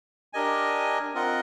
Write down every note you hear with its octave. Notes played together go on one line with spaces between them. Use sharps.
D4 G4 A#4 D#5 G#5
C4 F4 A#4 D#5 F#5